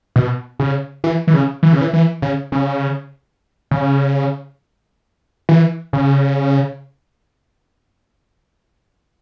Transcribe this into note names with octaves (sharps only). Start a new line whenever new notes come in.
B2
C#3
E3
E3
C#3
E3
C#3
E3
E3
C#3
C#3
C#3
E3
C#3